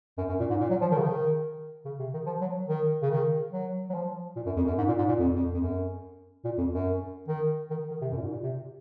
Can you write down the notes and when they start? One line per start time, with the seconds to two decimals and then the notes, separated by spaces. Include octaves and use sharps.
0.18 F#2
0.29 F#2
0.40 A#2
0.50 G#2
0.60 A#2
0.70 F#3
0.81 F3
0.91 D#3
0.97 C#3
1.02 D#3
1.85 C#3
1.99 C3
2.14 D#3
2.26 F3
2.41 F#3
2.68 D#3
3.02 C#3
3.11 D#3
3.52 F#3
3.90 F#3
3.94 F3
4.36 A#2
4.46 F#2
4.57 F2
4.67 F#2
4.78 G#2
4.88 A#2
4.98 G#2
5.08 A#2
5.19 F2
5.35 F2
5.54 F2
5.61 F#2
6.45 A#2
6.58 F2
6.72 F#2
7.28 D#3
7.70 D#3
7.91 D#3
8.01 C3
8.12 F#2
8.17 A#2
8.22 G#2
8.32 A#2
8.43 C3